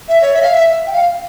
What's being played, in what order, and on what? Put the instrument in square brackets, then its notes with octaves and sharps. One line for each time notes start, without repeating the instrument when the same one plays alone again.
[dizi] E5
C#5
E5
F5
E5
G5
F5